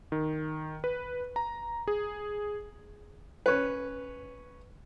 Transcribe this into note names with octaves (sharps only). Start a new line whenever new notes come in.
D#3
B4
A#5
G#4
C#4 B4